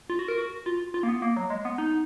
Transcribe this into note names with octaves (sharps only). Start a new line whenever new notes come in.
F4
F#4
A#4
F#4
F4
F4
A#3
B3
A#3
F#3
G#3
B3
D#4